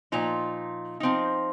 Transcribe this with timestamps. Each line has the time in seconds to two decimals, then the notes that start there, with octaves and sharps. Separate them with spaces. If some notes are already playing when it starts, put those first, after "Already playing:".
0.12 A#2 F3 D#4 A#5
1.00 F3 C4 D#4